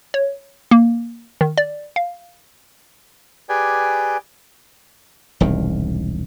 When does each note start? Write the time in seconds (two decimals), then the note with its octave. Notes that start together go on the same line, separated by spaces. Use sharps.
0.14 C#5
0.71 A#3
1.41 D#3
1.58 D5
1.96 F5
3.49 G4 G#4 B4 D5 G5 G#5
5.40 E1 C2 D#3